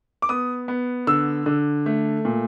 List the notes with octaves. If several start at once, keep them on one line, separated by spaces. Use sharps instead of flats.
D6
B3 D#6
B3
D3 E6
D3
A3
A#2